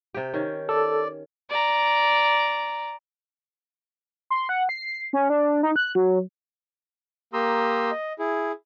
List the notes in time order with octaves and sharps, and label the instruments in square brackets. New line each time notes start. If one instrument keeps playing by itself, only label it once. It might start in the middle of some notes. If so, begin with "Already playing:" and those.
[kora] C3 G4
D#3 C#4
[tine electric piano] A4 [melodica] D5
[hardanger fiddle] D5 A#5
[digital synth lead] C6
F#5
C7
C#4
D4
D#4
F#6
F#3
[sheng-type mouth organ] A#3 G4 A#5 C6 D#6 E6
D#5
E4 G#4